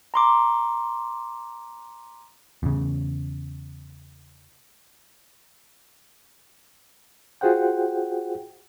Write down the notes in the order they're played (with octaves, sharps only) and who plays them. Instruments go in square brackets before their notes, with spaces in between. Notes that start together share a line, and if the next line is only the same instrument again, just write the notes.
[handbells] A#5 C6 D6
[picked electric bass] E2 C#3
[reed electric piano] F4 F#4 G#4 C5 F#5 G5